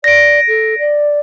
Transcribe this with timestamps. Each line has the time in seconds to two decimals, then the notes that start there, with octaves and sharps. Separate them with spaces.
0.04 D5 A#6 D7
0.48 A4
0.78 D5